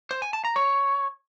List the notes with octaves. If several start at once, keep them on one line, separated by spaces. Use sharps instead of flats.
C5
G#5
A5
A#5
C#5